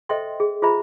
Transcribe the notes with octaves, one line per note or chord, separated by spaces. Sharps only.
A4 C5 D#5 E5 G5 C6
G#4
F4 G#4 C5 E5 A#5 B5